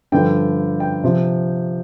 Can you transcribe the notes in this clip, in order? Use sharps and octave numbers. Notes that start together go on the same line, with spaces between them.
G2 D3 F3 G5
G5
C3 F3